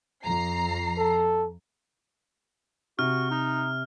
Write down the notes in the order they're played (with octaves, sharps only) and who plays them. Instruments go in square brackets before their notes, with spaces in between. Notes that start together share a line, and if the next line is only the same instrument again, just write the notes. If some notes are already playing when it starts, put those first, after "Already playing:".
[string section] F2 A#5 C7
[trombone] A4
[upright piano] C3 [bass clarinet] F#4 [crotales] F6
[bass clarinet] D#4